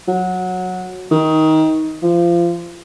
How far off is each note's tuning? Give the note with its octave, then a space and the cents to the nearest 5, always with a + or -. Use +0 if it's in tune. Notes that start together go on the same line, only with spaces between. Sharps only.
F#3 -15
D#3 +20
F3 -25